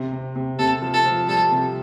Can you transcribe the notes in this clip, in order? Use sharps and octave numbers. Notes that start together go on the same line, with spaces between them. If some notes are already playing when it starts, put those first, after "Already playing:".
Already playing: C3
C3
C3
C3 A4
F3
A4
F3
G3 A4
C3